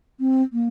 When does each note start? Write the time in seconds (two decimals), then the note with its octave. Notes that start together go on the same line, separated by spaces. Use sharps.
0.20 C4
0.53 A#3